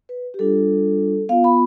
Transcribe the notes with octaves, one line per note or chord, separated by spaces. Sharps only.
B4
G4
G3 D4 F4 A4
B3 F4 F5
B5